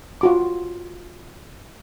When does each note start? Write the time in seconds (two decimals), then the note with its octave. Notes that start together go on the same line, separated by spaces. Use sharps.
0.21 F4 F#4 D6